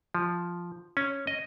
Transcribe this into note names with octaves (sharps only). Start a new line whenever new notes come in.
F3
C#4
D#5